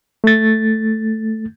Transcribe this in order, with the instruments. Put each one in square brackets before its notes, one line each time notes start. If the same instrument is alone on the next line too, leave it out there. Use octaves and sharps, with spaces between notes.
[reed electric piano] A3 A6